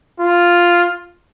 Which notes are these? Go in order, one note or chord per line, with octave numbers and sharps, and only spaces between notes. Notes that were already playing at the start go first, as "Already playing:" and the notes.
F4